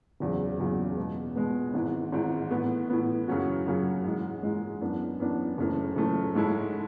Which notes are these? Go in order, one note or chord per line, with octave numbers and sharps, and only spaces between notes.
F#1 E2 C#3 F#3
F#1 E2 C#3 F#3
B2 G#3 B3
B2 G#3 B3
G#1 G#2 E3
G#1 G#2 E3
A2 E3 B3
A2 E3 B3
F#2 C#3 F#3 C#4 F#4
F#2 C#3 F#3 C#4 F#4
G#2 E3 G#3
G#2 E3 G#3
F#2 E3 B3 D4
F#2 E3 B3 D4
F#1 F#2 E3 A3
F#1 F#2 E3 A3
G#2 G#3 C#4 E4 A4